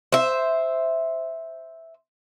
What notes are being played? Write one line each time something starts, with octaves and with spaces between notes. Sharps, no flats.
C5 E5